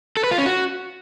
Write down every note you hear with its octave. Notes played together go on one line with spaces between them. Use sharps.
A4
B4
F4
C#4
F#4